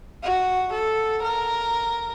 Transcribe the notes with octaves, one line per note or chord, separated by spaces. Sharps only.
F#4
A4
A#4